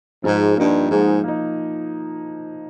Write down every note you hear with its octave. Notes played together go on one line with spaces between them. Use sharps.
G#2 F3
G2 A#3 D#4
G#2 F3
A#3 D#4